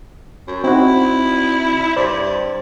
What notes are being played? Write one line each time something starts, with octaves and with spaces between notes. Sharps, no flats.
F#2
C4 D#4 E4 F#4
G2 C5 D5